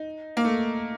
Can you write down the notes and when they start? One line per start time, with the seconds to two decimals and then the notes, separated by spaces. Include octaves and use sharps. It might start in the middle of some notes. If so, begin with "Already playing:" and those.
Already playing: D#4
0.37 A#3
0.44 A3